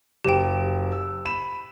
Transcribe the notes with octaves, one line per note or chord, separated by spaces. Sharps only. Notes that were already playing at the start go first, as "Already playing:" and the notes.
F#1 G4 G5 E7
E6
B5 E7